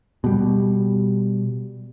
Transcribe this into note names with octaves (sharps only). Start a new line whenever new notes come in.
B2 G3